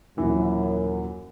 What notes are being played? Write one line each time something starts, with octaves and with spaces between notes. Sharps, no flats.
D#1 F#2 E3